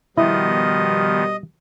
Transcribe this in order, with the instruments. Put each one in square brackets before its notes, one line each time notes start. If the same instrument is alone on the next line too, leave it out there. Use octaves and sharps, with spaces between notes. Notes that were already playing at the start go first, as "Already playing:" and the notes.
[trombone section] B2 G3 [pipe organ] D#3 F3 B3 [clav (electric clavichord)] E4 [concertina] D#5